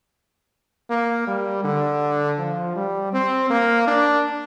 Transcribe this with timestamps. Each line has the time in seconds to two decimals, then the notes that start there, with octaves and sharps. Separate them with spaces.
0.90 A#3
1.27 G3
1.64 D3
2.39 F3
2.76 G3
3.13 C4
3.50 A#3
3.87 D4